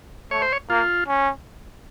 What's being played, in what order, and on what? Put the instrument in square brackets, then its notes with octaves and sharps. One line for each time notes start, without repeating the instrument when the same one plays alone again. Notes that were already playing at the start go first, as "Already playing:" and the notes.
[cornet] A3 [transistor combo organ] C#5
[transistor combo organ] C5
C#5
[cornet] A#3 [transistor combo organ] F4
[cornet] C#4